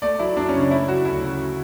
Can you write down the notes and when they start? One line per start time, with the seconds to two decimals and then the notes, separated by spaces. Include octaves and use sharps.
0.02 A3 D5
0.19 F#3 E4
0.37 F#2 D4
0.49 C#4
0.54 C#3
0.60 D4
0.71 A3 E4
0.88 F#3 F#4
1.05 D2 E4
1.22 C#3